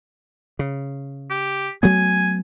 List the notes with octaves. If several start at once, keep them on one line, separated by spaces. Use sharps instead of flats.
C#3
G4
F#3 A3 B3 G#5